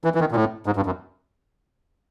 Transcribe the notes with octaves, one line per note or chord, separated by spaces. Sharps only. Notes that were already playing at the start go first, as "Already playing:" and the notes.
E3
E3
D#3
A#2
A2
G#2
G2
F#2